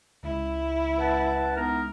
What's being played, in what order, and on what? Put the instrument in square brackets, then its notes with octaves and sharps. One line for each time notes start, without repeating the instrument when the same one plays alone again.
[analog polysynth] C#2 [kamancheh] E4
[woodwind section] B4 F#5 A5
B3 D#4 A#4